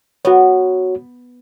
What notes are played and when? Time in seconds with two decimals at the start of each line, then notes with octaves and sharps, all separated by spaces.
0.25 B3 F#4 C#5